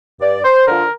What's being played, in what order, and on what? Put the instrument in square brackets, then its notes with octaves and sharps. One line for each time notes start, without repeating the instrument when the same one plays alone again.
[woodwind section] G2 D5
C5
D3 F3 A#4